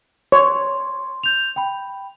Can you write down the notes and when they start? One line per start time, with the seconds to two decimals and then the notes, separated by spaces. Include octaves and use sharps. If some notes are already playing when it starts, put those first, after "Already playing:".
0.32 C#5 C6
1.23 G6 F7
1.56 G5 B5